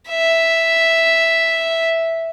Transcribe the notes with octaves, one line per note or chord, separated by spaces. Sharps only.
E5